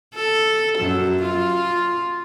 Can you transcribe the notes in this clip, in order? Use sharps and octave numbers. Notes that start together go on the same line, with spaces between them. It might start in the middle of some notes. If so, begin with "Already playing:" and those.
A4
F#2
F4